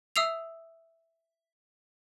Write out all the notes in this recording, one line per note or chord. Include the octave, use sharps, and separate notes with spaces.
E5 D#6 E6 C7 F7